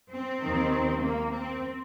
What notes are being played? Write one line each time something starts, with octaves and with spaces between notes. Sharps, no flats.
C4
D#2 D#3
A#3
C4